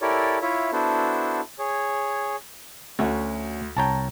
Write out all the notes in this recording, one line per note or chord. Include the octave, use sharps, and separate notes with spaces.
E4 G4 A4 A#4 C#5 D5
E4 F4 C#5 E5
B3 D4 E4 F#4 A4 C5
G#4 C#5
D2 A3 C#4 F#4
C2 C#5 G5 A5 A#5